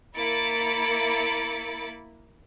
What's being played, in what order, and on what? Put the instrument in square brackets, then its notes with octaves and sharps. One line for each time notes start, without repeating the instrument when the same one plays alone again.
[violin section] A#3 E4 B5 A6 C#7 D7